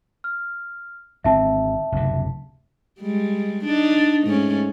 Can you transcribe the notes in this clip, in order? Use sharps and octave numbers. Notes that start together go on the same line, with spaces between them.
F6
G#1 D3 C4 E5 A5
F#1 D2 C3
G3 G#3
D4 D#4
G#2 A3 C#4